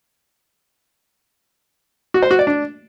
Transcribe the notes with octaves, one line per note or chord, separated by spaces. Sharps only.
F#4
C5
F#4
D5
D4